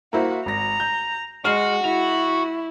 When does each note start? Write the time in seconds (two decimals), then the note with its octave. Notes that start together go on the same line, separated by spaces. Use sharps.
0.13 A#3 E4 F#4 C5
0.46 G#1 A#5 A#6
0.80 G6
1.45 G#3 F#4 F6 C7
1.84 E4 F7